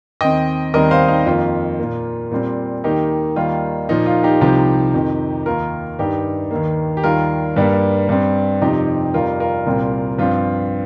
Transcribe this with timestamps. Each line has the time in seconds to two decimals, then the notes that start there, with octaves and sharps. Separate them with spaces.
0.21 D#2 D#3 C4 D#5 G5
0.74 D#2 D#3 G3 C4 A#4 D#5
0.91 C5 F5
1.08 D#4
1.26 F2 D#3 A#3 F4
1.79 A#2 A#3
2.31 A#2 G3 C4
2.84 D#2 D#3 A#3 D#4 G4
3.36 D#2 D#3 G3 A#3 F4
3.89 A#2 F3 A#3 D#4
4.06 F4
4.24 D#4 G4
4.41 C2 C3 F3 D#4 G4
4.94 F2 C3 D#3
5.46 D#2 D#3 A#3 F4 A#4
5.99 G2 D#3 G3 D#4 G4
6.51 D#2 D#3 A#3
6.97 G4
7.04 D#2 D#3 G3 F4 A#4
7.56 G2 G3 A#3
8.09 G2 G3 C4
8.61 F2 C3 F3 C4 D#4 G4
9.14 F2 C3 G3 F4 A#4
9.40 F4 A#4
9.66 C2 A#2 G3 C4
10.18 G2 F3 C4 F4